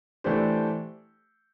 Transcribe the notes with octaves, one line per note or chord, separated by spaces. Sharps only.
E3 A3 D4 G4 C5